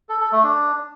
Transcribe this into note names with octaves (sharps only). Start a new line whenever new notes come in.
A4
A4
A3
D4